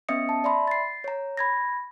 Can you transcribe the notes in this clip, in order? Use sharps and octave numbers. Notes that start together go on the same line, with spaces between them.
B3 C#4 D#5 E5 D#6 C#7
A5
D5 E5 B5 C6
A6 C7
C#5 A#5
B5 G#6 A#6